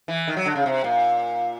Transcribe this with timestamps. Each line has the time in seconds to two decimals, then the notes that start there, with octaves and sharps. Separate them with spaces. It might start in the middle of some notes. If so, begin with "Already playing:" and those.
0.08 E3
0.27 D#3
0.37 F#3
0.46 D3
0.55 C#3
0.66 C3
0.84 A#2